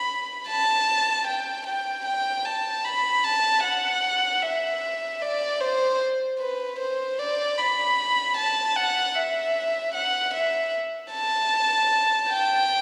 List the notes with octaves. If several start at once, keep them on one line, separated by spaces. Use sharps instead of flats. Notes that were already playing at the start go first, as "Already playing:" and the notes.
Already playing: B5
A5
G5
G5
G5
A5
B5
A5
F#5
E5
D5
C5
B4
C5
D5
B5
A5
F#5
E5
F#5
E5
A5
G5